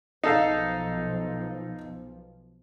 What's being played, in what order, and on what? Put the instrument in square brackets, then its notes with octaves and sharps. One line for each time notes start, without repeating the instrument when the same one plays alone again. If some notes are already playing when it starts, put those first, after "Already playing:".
[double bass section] B1 F3 [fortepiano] D#4 A4 F5